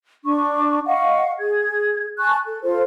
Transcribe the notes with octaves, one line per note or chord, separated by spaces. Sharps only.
D4 C#6
D#5 F5 F#5 C#6
G#4 G#6
G#5 A5 C#6 F#6
A4
F4 A4 C5